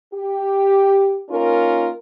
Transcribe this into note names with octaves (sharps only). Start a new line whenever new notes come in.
G4
A#3 C#4 D#4 F4 A#4